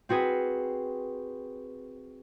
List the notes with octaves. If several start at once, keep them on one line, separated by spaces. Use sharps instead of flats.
C4 F#4 G#4 B4